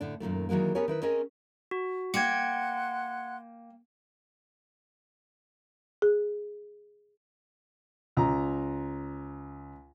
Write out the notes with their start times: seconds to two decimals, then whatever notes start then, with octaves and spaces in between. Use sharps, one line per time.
0.01 A2 D3 D4
0.20 F#2 A#2 D#3 A3
0.49 D#3 E3 F#3 G#3 A#3
0.75 B3 C#4 G4 G#4 A#4 C#5
0.88 D#3 E4 B4
1.02 C4 C#4 G#4 A#4 D#5
1.71 F#4
2.14 A#3 F#5 G5 C6 F#6 G#6 C#7
6.02 G#4
8.17 C#2 A#5